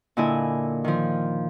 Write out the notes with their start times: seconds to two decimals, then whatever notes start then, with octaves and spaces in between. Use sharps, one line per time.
0.17 A#2 D3 E4 D#5 G#5
0.84 D#3 F3